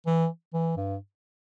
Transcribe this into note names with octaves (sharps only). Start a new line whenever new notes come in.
E3
E3
G2